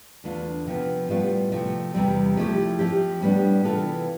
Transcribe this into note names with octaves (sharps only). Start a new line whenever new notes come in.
E2 D3 A3 D4 F4
C3 F3 B3
A2 G3 B3 F4
C3 F3 A3
E2 C3 G3 C4
F3 A3 E4 G4
F3 C4 G4
A2 G3 B3 D4
C3 E3 B3 F4 A4